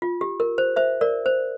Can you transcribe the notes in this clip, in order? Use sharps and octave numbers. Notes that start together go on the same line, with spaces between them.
F4
G4
A#4
C5
C5 E5
A#4 D5
C5